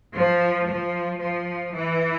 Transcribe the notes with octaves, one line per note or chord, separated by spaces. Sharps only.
F3
F3
F3
E3